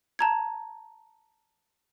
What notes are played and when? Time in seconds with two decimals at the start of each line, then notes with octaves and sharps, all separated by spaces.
0.19 A5 A#5 G#6